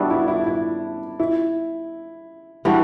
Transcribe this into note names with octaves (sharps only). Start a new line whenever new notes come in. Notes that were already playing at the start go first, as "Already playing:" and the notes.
Already playing: G3 B3 D4 E4 F#4 A4
E4
E4
E4
E4
E3 G3 D4 F#4